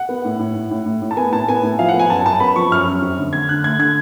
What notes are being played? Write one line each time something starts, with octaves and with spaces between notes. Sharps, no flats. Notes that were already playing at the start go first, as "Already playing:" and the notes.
Already playing: F#5
B3
A2
A2
A2
A2
A2
A2
A5
B3 G#5
A2 A5
B3 G#5
A2
F3 F5
F#5
B3
G#5
F#2 A5
F#2 A5
B3 B5
F3 C#6
F#2 F6
F#2
F2
D3
D3 G#6
D3 F#6
A3 G#6
D3 G#6